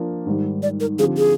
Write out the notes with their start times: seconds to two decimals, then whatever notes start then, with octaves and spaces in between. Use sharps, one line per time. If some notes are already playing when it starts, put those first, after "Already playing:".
Already playing: F3 A#3 D4
0.26 G#2 D#3 G3
0.63 D5
0.80 A#4
0.99 D3 F3 C4 G4 G#4
1.17 G#4